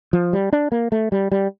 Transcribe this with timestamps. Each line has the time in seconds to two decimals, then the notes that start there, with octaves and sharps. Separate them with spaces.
0.13 F3
0.33 G3
0.53 D4
0.72 A#3
0.92 A3
1.12 G3
1.32 G3